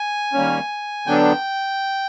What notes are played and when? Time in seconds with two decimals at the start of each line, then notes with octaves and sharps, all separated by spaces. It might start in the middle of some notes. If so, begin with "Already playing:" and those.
Already playing: G#5
0.33 D#3 G3 A#3 C#4
1.06 D3 F#3 B3 D4 G5